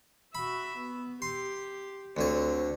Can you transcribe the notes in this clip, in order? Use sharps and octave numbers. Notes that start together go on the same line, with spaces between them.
F#4 E5 B5
B3
G4 C6
D2 D3 C4 C#5